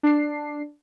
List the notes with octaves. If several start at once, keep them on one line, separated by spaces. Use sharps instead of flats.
D4 C7